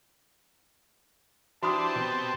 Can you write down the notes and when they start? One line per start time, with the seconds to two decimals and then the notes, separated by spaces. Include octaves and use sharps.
1.63 E3 D4 F#4 G4 C5 A5 B5 D#6
1.96 B2 C4